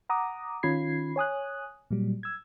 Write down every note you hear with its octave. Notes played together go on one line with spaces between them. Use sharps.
F#5 A#5 D6 D#6
D#3 C#4 F4 B5 G#6 C7
C#5 G#5 D#6 F#6
A#2 F#3 G3
E6 G#6